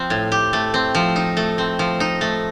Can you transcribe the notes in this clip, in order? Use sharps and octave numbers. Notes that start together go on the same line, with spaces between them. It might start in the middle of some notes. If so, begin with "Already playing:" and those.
Already playing: F3 C4
A2
G4
A3
C4
F3
D#4
A3
C4
F3
D#4
A3